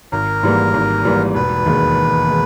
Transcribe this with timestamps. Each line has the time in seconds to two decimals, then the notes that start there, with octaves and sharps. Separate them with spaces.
0.12 G#1 A#4
0.43 G#2 E3 G3 A#3
0.74 G#1
1.04 G#2 E3 G3 A#3
1.35 E1 B4
1.66 D#2 D#3 G#3
1.96 E1
2.29 D#3 G#3